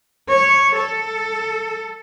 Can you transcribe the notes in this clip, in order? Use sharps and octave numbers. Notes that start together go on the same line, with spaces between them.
C#5
A4